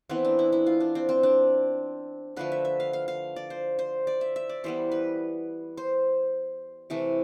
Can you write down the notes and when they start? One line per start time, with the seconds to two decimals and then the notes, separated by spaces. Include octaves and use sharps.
0.09 E3 B3 C4
0.25 D4
0.39 E4
0.52 E4
0.67 F4
0.80 D4
0.95 C4
1.09 C4
1.23 D4
2.36 D3 F3 A3 B4
2.52 E5
2.65 E5
2.80 F5
2.93 F5
3.08 F5
3.36 D5
3.50 C5
3.79 C5
4.07 D5
4.21 E5
4.36 E5
4.49 D5
4.64 E3 G3 B3 C5
4.92 B4
5.77 C5
6.90 C3 E3 A3